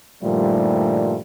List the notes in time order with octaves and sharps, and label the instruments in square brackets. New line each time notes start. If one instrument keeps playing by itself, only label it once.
[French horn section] G2 A#2 D#3 F3 G3 A3